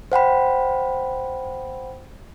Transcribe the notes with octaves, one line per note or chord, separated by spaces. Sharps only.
C5 F#5 G5 B5